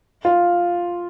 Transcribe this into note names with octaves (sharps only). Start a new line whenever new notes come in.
F4